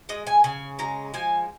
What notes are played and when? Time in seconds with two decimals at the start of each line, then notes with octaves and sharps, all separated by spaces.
0.09 G#3 D#5
0.27 G#5
0.44 C#3 G#5
0.79 G#3 A#5
1.14 F3 G#5